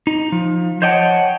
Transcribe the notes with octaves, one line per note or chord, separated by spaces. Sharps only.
D#4
F3
C5 C#5 D#5 F#5 G5 A5